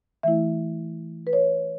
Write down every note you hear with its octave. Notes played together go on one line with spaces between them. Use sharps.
E3 A3 E4 E5
B4
C#5